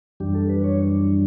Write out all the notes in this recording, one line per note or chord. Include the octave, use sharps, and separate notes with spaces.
F#2 E3 G3 D4 G4
A4
B4
C#5